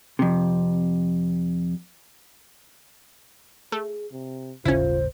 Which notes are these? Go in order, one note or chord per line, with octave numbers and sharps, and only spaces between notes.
F2 C3
A3 G#4
C3
D#1 G#1 C#3 C#4 E4 F4 C5